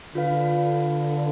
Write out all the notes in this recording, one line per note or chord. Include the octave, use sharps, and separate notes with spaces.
D3 F4 B4 F5